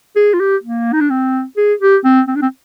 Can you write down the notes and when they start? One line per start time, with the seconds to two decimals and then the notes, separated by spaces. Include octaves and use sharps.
0.16 G#4
0.34 F4
0.40 G4
0.63 A#3
0.93 D#4
1.01 D4
1.10 C4
1.57 G#4
1.80 G4
2.05 C4
2.28 C4
2.35 D4
2.42 C4